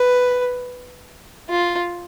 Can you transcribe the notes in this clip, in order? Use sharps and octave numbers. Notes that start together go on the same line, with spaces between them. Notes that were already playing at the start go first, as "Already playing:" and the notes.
Already playing: B4
F4